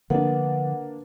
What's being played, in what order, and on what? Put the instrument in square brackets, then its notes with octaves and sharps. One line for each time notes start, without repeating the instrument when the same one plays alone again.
[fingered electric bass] D3 F3 [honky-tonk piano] A#3 D4 [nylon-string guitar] B3 [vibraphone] F#5